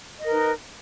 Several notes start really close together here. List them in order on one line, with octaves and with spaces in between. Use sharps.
D#5 A#4 B4 D#4